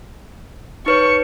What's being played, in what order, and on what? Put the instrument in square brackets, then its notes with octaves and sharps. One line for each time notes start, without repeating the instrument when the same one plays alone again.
[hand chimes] D#4 B4 C#5 [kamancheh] C#6